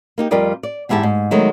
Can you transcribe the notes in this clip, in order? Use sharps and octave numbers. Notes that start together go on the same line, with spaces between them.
A#3 D#4 G4
F2 G3 F4 A#4 D5 D#5
D5
E2 G#2 E4 G4 A5
G#2
D#3 F#3 G#3 A3 B3 D#4